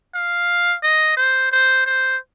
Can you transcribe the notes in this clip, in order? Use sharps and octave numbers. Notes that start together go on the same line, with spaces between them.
F5
D#5
C5
C5
C5